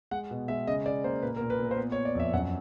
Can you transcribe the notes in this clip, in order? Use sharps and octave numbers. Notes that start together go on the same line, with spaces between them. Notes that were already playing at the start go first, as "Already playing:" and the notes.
G#3 F#5
B2
G#3 E5
C#3 D#5
C#3 D5
A#3 C5
A#2 B4
A#4
A#2
B4
A#2 A#4
C5
B3 B4
C#5
B3
D5
F2 E5
F#2 F#5